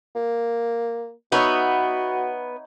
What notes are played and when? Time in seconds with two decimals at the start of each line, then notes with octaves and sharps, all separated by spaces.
0.15 A#3
1.32 B3 D#4 F#4 C#5 E5